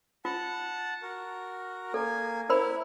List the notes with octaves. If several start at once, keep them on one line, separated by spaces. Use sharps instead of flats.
F4 F#5 A5
F#4 A#4
A#3 A4 G#5
E4 A#4 C5 B5